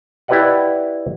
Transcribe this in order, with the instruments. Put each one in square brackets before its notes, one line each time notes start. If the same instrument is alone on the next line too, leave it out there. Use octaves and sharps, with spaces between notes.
[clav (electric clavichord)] E4 G4 B4 D5 D#5 F#5